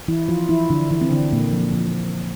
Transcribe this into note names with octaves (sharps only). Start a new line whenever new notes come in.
E3 E4
F3 F4
E3 E4
D3 D4
E3 E4
C4
D3 D4
A#2 A#3
F3
F3